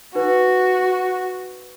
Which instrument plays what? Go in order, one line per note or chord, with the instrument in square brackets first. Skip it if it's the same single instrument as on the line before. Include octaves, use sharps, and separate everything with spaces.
[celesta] D#4 B4 [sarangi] F#4